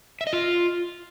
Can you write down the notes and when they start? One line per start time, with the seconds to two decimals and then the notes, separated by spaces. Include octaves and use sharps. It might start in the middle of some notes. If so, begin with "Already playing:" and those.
0.21 E5
0.27 D#5
0.33 F4